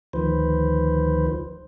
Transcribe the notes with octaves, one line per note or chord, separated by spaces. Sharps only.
D2 D#3 F3 B4 C5